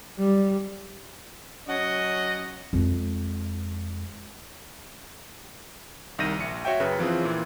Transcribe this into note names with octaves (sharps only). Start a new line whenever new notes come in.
G3
F#3 C#4 F#4 D#5 F#5
F2 G#3
C2 D#3 G6 A#6 D#7
A#1 C#7
F#4 C#5 E5 G5
F#2 C#3 B4
E3 F3 C4 C#4 F4 G#4
A#2 E3